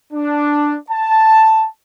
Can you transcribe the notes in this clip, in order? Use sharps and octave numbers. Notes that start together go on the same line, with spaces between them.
D4
A5